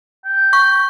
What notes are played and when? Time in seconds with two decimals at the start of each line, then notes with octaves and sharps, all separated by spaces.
0.25 G5
0.53 C#6